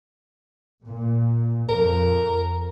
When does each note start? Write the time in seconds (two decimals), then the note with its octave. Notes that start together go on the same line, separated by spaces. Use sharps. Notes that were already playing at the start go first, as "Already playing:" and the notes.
0.85 A#2
1.69 F2 A#4